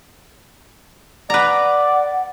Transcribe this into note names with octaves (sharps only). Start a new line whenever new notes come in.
B4 D5 F#5 A#5